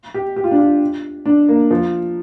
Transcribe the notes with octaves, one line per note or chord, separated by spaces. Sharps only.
G4
G4
F4
D4
F4
D4
A#3
F3